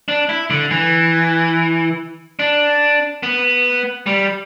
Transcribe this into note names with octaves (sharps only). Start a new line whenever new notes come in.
D4
E4
D3
E3
D4
B3
G3